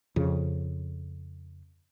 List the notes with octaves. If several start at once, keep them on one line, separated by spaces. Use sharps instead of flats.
F2 C#3